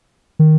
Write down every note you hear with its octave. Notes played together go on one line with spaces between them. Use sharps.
D#3